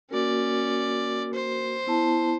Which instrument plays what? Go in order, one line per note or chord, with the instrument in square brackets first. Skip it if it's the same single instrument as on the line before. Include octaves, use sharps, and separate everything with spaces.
[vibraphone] A#3 F#4 A#4 [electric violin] C#4 D5
[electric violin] C5
[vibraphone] B3 E4 A5